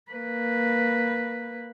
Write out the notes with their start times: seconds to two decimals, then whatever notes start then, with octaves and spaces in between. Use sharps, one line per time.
0.11 A#3 B4